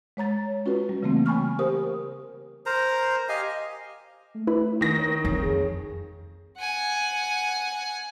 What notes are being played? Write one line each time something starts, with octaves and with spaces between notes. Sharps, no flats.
G#3 C#5 A#5 A6
C#4 F4 F#4 B4
G3
C#3 E3 G3 A3 A#3 C4
G5 G#5 B5 C#6 F6
G4 A#4 C5 D#6
A#4 C5 A#5
G4 D#5 F5 G#5
A3
E4 B4 B5
D#3 A#6
C#5
F2
G#4
F#5 G#5